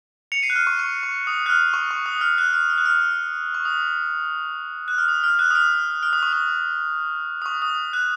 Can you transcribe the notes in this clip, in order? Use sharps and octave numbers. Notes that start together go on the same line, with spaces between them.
C#7 F7
C7 D#7
F#6
F6
C#6
C#6
C#6
D#6
F#6
F6
C#6
C#6
D#6
F6
F#6
F6
F6
F#6
F6
C#6
D#6
F#6
F6
D#6
F6
F#6
D#6
F6
F6
D#6
C#6
D#6
D#6
C#6
D#6
F#6